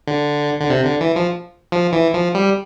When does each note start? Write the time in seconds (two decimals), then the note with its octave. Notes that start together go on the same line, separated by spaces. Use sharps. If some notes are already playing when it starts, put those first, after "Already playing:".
0.07 D3
0.61 D3
0.70 C3
0.84 D3
1.01 E3
1.16 F3
1.72 F3
1.93 E3
2.14 F3
2.35 G3